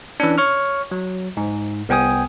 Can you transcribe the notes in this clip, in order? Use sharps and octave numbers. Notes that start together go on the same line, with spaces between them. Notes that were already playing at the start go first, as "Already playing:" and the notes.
E3 C#4 D4
C#5 C#6 F6
F#3
G#2
C2 B3 G5 G#5 D#6